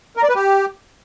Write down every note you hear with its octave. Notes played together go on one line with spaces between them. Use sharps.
A#4
D5
B4
G4